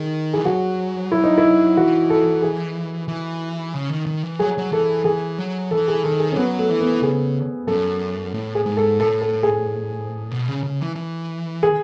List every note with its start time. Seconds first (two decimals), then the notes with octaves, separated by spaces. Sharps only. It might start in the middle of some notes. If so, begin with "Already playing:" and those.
Already playing: D#3 G#4
0.33 E3 G#4
0.45 F#3 F#4
1.12 E4
1.24 D#4
1.38 E4
1.77 E3 F#4
2.10 A4
2.42 G#4
3.08 E3
3.74 C#3
3.90 D#3
4.07 D#3
4.23 E3
4.39 F#3 G#4
4.58 F#3
4.72 E3 A4
5.05 E3 G#4
5.39 F#3
5.71 E3 A4
5.88 G#4
6.03 D#3 A4
6.20 G#4
6.32 C#4
6.36 F#3 B3
6.59 A3
6.70 E3
6.81 B3
7.02 C#3 G#4
7.67 F#2 A4
8.34 A2
8.55 G#4
8.66 G#2
8.77 A4
8.99 A2 A4
9.21 A4
9.43 G#4
10.31 B2
10.48 C#3
10.63 C#3
10.80 E3
10.96 E3
11.63 G#4